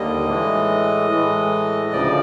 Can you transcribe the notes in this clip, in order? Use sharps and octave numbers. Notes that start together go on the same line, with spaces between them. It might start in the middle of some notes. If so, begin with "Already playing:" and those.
Already playing: D#2 D3 G3 A#3 D#5
A2 E3 G#3
A2 E3 G#3
D2 C#3 F3 D5